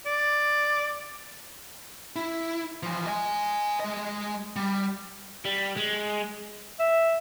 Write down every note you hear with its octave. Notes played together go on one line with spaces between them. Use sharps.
D5
E4
E3 F3
D#5 G#5
G#3 D#5
G3
G3
G#3
E5